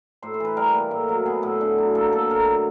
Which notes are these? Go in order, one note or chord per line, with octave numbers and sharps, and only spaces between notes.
A2 C5
C5
E3 B4
G3 A#4
A#3
A2
F#3
B3 G#4
A2
D3
F#3
A#3 A4
D3 A4
A2 A#4
F#3